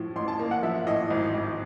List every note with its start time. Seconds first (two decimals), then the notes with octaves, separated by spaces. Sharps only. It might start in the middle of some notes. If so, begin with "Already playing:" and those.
Already playing: A2 F3
0.16 A1 C6
0.28 A5
0.39 A#3
0.51 F#5
0.63 F3 E5
0.87 A2 D#5
1.11 G#1
1.34 G#1